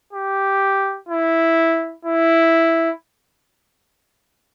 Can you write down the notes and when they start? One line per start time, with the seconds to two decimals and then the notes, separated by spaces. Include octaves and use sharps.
0.13 G4
1.08 E4
2.05 E4